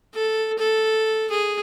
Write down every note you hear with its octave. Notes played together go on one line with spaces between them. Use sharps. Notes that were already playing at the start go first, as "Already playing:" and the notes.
A4
A4
G#4